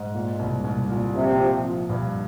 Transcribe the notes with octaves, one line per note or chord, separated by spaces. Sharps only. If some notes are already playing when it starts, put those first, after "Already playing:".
Already playing: G#2
A#2
C2
C2
A#2
C3 F3
F3
F3
G2